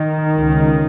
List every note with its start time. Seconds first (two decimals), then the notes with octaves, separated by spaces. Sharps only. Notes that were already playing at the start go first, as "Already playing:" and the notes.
Already playing: D#3
0.36 C#2 C#3